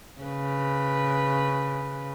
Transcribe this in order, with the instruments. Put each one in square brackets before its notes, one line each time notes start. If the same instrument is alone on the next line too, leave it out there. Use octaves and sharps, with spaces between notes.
[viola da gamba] C#3 B4